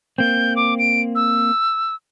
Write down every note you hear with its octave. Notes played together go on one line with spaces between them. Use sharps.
A#3 C4 G6
D6
D7
E6